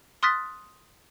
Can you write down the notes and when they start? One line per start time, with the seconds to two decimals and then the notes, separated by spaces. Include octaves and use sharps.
0.23 C6 D#6 F6 F#6 A6 B6